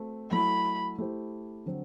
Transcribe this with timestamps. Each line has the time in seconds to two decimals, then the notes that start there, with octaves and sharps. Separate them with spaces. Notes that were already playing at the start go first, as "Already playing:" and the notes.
Already playing: A3 C4 F#4
0.31 F#3 A3 E4 B5
0.98 A3 E4 G4 C5
1.66 D3 F#3 C4